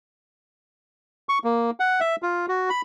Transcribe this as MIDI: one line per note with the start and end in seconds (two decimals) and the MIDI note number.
1.29 1.39 85
1.44 1.71 58
1.80 2.00 78
2.00 2.16 76
2.23 2.46 65
2.48 2.70 66
2.70 2.82 83